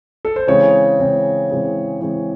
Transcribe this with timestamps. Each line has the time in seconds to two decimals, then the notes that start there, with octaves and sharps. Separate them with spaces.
0.25 A4
0.36 C5
0.47 C#3 E3 G#3 C4 C#5
0.99 C#3 E3 G#3 C4
1.49 C#3 E3 G#3 C4
2.01 C#3 E3 G#3 C4 C#5